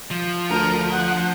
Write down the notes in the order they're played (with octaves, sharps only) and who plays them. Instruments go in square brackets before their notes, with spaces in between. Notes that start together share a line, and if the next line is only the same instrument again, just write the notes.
[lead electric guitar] F3
[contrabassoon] D2 [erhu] A#4
[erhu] F#5